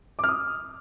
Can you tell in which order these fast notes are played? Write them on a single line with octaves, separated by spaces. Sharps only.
D6 F6 D#6